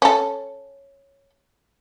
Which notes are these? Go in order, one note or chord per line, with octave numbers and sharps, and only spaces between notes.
C#4 A4